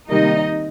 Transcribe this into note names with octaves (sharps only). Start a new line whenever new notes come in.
C3 D#3 G3 A#3 D#4 D#5